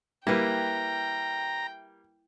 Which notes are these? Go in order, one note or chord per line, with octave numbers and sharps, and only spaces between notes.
G3 A#3 E4 B4 G5 A#5